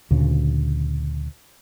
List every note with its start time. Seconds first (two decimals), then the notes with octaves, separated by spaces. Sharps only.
0.11 D2 A#2 C#3